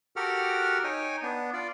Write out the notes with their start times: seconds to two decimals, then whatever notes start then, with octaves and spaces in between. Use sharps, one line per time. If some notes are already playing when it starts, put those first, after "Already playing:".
0.16 F#4 G4 A4 A#4 F#5 F6
0.84 D#4 C#5 G5 G#5
1.22 B3 D4
1.53 F4 D5